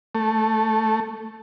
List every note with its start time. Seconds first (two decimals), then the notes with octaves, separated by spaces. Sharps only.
0.15 A3